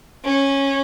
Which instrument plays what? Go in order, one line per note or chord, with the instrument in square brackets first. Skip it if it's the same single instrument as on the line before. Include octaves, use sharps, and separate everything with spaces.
[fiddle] C#4